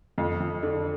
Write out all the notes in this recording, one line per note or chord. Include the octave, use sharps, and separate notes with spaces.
F2
F2
D3